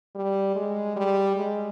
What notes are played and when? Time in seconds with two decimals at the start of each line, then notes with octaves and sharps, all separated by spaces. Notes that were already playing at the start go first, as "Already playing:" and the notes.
0.16 G3
0.56 G#3
0.96 G3
1.37 G#3